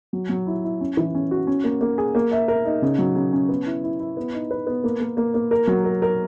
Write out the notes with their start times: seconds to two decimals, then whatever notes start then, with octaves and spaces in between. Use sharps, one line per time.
0.13 F#3
0.29 F#3
0.47 E4
0.64 E4
0.81 C#4
0.97 E3
1.15 C#4
1.31 F#4
1.47 C#4
1.64 A#3
1.81 A#3
1.98 G#4
2.15 A#3
2.31 E5
2.48 A#4
2.65 D#4
2.82 C#3
2.99 F#3
3.16 C#3
3.33 C#4
3.49 B3
3.66 E4
3.84 E4
4.00 E4
4.17 B3
4.33 D#4
4.51 B4
4.67 B3
4.84 A#3
5.00 A#3
5.17 A#3
5.34 A#3
5.51 A#4
5.67 F#3
5.84 A#4
6.02 A#4